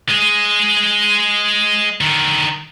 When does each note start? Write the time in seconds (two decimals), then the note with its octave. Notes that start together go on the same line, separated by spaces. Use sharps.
0.09 G#3 G#4
2.01 D3 D#3